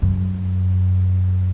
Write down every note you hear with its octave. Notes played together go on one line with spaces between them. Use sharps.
F#2